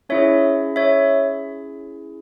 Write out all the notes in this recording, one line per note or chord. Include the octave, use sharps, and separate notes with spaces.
C#4 E4 G#4 C#5 E5
C#5 E5